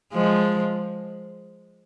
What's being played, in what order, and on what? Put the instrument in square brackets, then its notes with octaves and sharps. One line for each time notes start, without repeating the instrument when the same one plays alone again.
[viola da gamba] F3 G#3